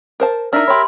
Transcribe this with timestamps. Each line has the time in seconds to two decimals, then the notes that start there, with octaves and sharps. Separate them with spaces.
0.20 A#4 C5 A5
0.53 D4 D#4 A#4 E5
0.68 G4 C#5 B5 C6